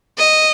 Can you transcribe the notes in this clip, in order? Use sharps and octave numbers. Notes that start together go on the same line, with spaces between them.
D#5